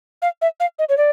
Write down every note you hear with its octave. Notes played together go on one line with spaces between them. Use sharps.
F5
E5
F5
D#5
C#5
D5